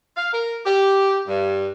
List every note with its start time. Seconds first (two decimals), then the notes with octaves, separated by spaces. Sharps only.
0.16 F5
0.33 A#4
0.65 G4
1.27 G2